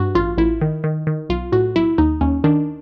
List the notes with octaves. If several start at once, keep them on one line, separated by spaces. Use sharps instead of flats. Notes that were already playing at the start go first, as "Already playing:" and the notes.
Already playing: G2 F#4
A1 F4
A1 E4
D#3
D#3
D#3
B1 F4
A2 F#4
B1 E4
D#2 D#4
D#2 C#4
D#3 D4